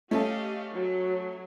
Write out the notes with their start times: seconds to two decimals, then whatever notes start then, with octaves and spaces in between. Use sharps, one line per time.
0.11 A3 C#4 G4 A4 D#5 F5
0.74 F#3